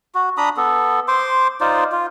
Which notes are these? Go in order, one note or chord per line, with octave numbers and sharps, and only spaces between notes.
F#4
D4 A#5 B5 D#6
B3 A4
C5 C6 D6
D#4 F4 C5 D5
F4